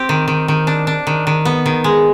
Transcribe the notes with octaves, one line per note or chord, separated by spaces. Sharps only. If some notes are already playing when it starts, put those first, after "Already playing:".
Already playing: C4 G4
D#3
D#3
D#3
D4
D4
D#3
D#3
B3
D#3
G#3